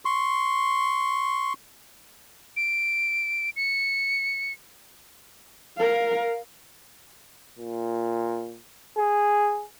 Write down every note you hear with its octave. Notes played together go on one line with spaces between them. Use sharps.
C6 C#6
D7
C#7
A#4 F5
A#2
G#4